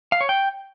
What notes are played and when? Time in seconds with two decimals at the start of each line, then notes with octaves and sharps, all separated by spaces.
0.12 F5
0.21 C#5
0.29 G5